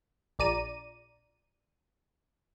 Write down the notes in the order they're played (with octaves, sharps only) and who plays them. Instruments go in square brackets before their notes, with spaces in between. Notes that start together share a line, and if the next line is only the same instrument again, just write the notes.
[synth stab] A#1 D5 A#5 D#7